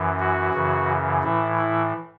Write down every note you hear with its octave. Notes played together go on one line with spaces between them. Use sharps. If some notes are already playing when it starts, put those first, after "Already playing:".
Already playing: F#2 E3
F#4
F#2 C#3 E3
A2 E3 E4
E4